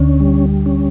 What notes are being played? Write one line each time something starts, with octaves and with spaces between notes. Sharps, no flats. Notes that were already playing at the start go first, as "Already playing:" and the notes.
Already playing: D2 D3 C#4
G3
C#4